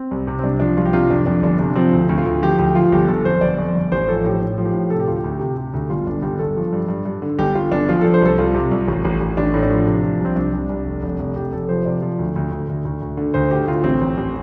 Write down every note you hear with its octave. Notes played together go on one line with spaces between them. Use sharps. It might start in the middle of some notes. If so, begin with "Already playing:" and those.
Already playing: C4
C2
C3
C4
C2 D4
F3 D4
C2 F4
G4
C3 F4
F2 D4
F2 D4
G1 D4
C3 D4
F3 C4
D2
D2
F4
D2
F3 G4
D2 G4
F3 F4
G1 G4
G1 A4
F2 C5
G1 D5
F2
G1
A1 C5
F3 A4
A2 G4
A2
F3
G4
A2
C3 A4
G4
D2 F4
G4
D2
C3
C3
D2
G1 F4
G1 D4
G1 G4
G1 A4
F3
G2
G2
G2
D3
G1 G4
G1 F4
G1 D4
F3 F4
F3 A4
C5
C2 A4
C2 F4
C3
C2
A1
A1
A1
A1 D4
A2
D4
F3
C3
F3
C2 C4
C2 D4
C2
C2
F1
F1
F1
F1 G4
F1 A4
F3 C5
C3 D5
F3
D2
D2
D2
D2
D2
D2
D3
D2 C5
D3 G4
D2 F4
A1 C4
A1
A1